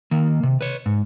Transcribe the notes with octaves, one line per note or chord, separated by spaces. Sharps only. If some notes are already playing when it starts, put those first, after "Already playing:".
D#3 A#3
C3
B4 C#5
G#2